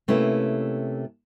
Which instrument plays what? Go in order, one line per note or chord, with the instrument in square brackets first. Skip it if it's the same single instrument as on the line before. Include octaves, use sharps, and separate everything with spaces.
[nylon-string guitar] C3 A3 A#3 C#4 E4 B4